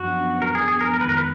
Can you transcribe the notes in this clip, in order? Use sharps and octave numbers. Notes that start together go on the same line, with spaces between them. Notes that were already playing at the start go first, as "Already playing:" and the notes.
Already playing: F#2 F3 B3 D4 F#4
A#4
G#4
G#4
A#4
F2 D#3 G#3 B3 F4 A#4
B4
A#4
B4